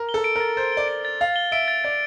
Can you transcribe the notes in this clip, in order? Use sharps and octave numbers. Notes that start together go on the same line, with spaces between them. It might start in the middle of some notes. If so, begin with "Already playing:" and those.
Already playing: A#4
G7
A4
D7
A#4 A6
C5 A6
D5 G7
D7
A6
F5 A6
G7
E5 D7
A6
D5 A6